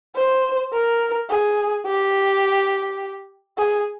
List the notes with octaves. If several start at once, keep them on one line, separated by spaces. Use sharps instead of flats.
C5
A#4
G#4
G4
G#4